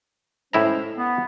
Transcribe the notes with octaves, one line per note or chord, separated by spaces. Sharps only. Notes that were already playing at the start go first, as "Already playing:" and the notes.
A2 G#3 C#4 E4 C5 A#5
B3